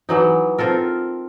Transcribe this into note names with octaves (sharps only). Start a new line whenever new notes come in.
E3 F#3 D#4
C4 F4 A4 A#4